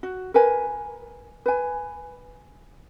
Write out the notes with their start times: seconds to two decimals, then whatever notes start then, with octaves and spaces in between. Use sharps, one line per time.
0.03 F#4
0.34 A#4 B4 G#5
1.46 B4 G#5